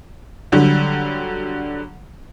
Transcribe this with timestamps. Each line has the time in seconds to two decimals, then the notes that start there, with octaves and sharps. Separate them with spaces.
0.52 D3 F#3 G3